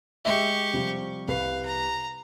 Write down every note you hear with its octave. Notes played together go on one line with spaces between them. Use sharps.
G#3 G4 D#5 E5 C#6
C3 F3 G3
C2 B4 F5 C7
A#5